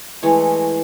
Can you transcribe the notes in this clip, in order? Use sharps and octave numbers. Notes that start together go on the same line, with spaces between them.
E3 G#3 A3 C#5